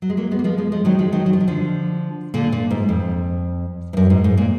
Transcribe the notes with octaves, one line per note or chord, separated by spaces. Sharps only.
F#3
G#3
F#3 A#3
G#3 B3
A#3
F3 G#3
F3 G#3
F3 G#3
D#3 F#3
F3 G#3
D#3 F#3
F#3
F3
D#3
D3 F3
A#2 D3
A#2
G#2
F2
G#2
F#2
G#2
G#2
A#2